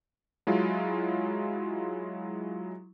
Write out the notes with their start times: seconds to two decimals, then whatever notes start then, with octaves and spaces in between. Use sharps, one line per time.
0.47 F#3 G#3 E4 F4